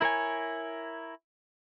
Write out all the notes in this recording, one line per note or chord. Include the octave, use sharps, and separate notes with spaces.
E4 A#4 C#5 G#5